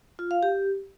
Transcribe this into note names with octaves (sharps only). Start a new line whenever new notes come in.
F4
F5
G4